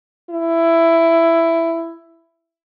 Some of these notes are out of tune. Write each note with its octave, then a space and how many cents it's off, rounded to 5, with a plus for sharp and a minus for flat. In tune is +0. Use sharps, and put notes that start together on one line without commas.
E4 +10